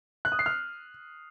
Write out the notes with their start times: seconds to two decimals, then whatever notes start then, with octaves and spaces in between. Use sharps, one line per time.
0.25 F#6
0.32 D#6
0.39 C7
0.46 F6